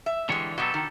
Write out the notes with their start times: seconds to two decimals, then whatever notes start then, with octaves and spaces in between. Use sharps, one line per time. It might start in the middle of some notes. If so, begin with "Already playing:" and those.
0.06 E5
0.29 D3 E3 G3 G#3 C#5
0.58 B2 F#3 F#4 G4 A4
0.74 D#3